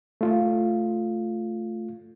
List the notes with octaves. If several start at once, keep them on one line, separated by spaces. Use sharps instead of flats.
A3 F4